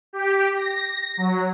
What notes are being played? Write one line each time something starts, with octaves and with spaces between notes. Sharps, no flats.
G4
A#6
F#3